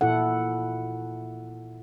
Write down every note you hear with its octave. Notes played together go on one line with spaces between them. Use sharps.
A#2 E4 A4 F#5